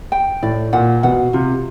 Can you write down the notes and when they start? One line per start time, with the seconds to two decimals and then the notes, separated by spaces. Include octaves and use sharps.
0.12 G5
0.43 A2 D5
0.73 A#2 F#5
1.03 B2 F#5
1.33 C3 F4